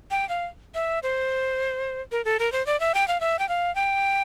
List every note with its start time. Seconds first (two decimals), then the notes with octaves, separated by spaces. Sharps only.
0.11 G5
0.29 F5
0.75 E5
1.03 C5
2.12 A#4
2.25 A4
2.39 A#4
2.52 C5
2.67 D5
2.80 E5
2.94 G5
3.08 F5
3.21 E5
3.39 G5
3.49 F5
3.75 G5